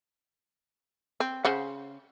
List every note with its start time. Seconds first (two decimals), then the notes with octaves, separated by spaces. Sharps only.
1.20 C4
1.45 C#3 C5 F#5